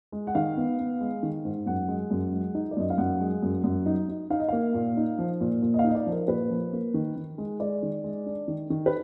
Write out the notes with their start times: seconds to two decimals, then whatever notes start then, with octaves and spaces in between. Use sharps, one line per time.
0.12 G#3
0.27 F#5
0.35 D#3 F5
0.57 B3
0.79 B3
1.01 G#3
1.23 D#3
1.45 G#2
1.66 F#2 F#5
1.88 G#3
2.11 F#2
2.32 G#3
2.55 D#4
2.71 D5
2.77 F#2 D#5
2.90 F5
2.98 F#2 F#5
3.20 G#3
3.43 F#2
3.64 F#2
3.86 D#4
4.09 D#4
4.30 D#4 F5
4.40 D#5
4.48 A#3 F5
4.74 A#2
4.97 D#4
5.18 F3
5.41 A#2
5.62 A#2
5.74 D#5
5.79 F5
5.84 D#4 D#5
5.95 D5
6.06 F3
6.12 A#4
6.28 A#2 B4
6.50 F3
6.73 A#3
6.94 D#3
7.16 D#3
7.38 G#3
7.60 G#3 D5
7.83 D#3
8.04 G#3
8.26 D4
8.48 D#3
8.70 D#3
8.86 B4